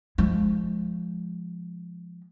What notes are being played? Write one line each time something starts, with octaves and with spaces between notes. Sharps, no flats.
F3 G#3